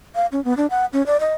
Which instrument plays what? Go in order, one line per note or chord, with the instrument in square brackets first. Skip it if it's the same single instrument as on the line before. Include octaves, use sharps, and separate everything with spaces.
[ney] F5
C#4
B3
D4
F#5
C#4
D5
D#5